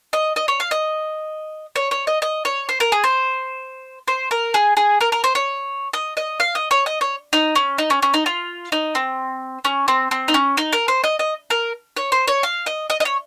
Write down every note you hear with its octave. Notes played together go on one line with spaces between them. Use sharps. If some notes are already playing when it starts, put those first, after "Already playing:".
D#5
D#5
C#5
F5
D#5
C#5
C#5
D#5
D#5
C#5
C5
A#4
G#4
C5
C5
A#4
G#4
G#4
A#4
A#4
C5
C#5
D#5
D#5
F5
D#5
C#5
D#5
C#5
D#4
C#4
D#4
C#4
C#4
D#4
F4
D#4
C4
C#4
C4
C4
D#4
C#4
D#4
A#4
C5
D#5
D#5
A#4
C#5
C5
C#5
F5
D#5
D#5
D#5
C#5